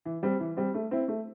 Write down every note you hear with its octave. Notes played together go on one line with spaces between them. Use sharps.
E3
G3 C4
E3
G3 C4
A3
C4 E4
A3